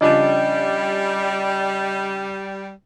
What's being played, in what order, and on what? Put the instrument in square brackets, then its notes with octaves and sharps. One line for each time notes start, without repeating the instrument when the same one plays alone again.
[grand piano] C#3 F3 D4 [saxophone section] G3 [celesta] D#5